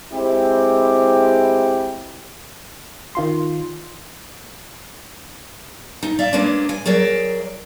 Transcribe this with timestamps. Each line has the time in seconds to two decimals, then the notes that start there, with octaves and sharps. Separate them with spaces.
0.13 G#3 C4 E4 G4
3.15 D#3 F4 C6
6.03 D#4
6.19 D5 E5 F5
6.33 G#3 A#3 C#4 D4 B4
6.69 G#5
6.86 F#3 G#4 A#4 D5 E5